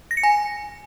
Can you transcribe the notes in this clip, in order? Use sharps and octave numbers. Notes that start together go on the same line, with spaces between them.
A#6
C#7
G#5